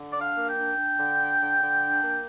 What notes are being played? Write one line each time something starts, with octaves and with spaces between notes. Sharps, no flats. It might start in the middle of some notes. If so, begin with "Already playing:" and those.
Already playing: D3
D4 D5
F5
A#3
G5
D4
D4
D3
D4
D3
D3
D4
A#3